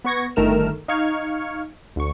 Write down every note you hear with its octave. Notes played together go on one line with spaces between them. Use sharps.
B3 B4 C#6 G#6 A#6
G1 D#3 A3 A#4 F6 E7
D#4 F5 C#6 F6 G#6 C#7
D2 C#6